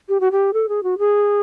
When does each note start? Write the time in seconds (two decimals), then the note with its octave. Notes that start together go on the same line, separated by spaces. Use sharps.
0.09 G4
0.20 F#4
0.32 G4
0.53 A4
0.69 G#4
0.83 F#4
0.98 G#4